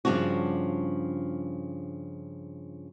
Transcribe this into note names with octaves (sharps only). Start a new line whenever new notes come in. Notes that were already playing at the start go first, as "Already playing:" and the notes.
G2 C#3 F3 D4 F#4